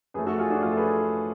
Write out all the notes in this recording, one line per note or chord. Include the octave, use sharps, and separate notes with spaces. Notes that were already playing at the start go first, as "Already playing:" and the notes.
F#2 F3 A3 G#4 B4
F#4 A4
F4 G#4
D4 F#4
F#2 F3 A3 F4
A4
G#4 B4